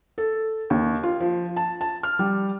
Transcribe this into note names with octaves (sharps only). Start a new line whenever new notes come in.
A4
D#2
F4
F3
A5
A5
F6
G3